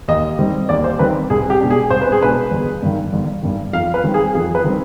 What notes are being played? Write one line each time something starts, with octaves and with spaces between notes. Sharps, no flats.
D#2 D#5
D#3 G3 C4
D#2 D5
C5
D#3 G3 C4 B4
C2 G#4
G4
B2 G#3 D4
G#4
C2 C5
B4
G#4
B2 G#3 D4 B4
G1
G2 D#3
G1
G2 D#3
F2 F5
B4
D#3 G3 C4
G#4
F2 G#4
B4
D#3 G3 C4